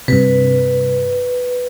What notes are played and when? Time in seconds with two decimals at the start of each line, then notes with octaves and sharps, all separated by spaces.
0.08 G2 C3 B4